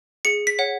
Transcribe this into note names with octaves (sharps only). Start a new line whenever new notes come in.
G#4 C#7
B6
C#5 F#5